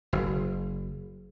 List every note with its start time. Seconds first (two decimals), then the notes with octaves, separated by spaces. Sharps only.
0.13 F#1